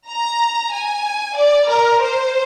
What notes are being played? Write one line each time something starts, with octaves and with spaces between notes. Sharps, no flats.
A#5
G#5
D5
A#4
C5